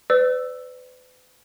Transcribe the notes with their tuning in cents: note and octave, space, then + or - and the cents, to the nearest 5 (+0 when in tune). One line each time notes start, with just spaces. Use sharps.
B4 +40 D5 -5 E6 +0